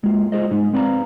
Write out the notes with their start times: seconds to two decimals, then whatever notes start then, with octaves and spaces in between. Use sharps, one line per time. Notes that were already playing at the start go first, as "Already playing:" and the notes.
0.04 G#3 A#3 F4
0.32 F4 G#4 C5 D#5
0.51 G#2 G#3 D#4
0.73 C4 B4 D5 F5 A#5